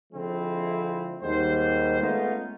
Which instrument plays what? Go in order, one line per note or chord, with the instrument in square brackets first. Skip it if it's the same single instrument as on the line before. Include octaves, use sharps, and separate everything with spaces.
[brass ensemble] D3 F3 G#3 C4 E4
D#2 G#2 D#3 G3 C5
G#3 A3 B3 C#4 D#4 F4